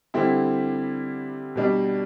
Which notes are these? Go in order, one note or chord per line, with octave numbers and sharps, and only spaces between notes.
D3 G3 C4 E4
B2 G3 D4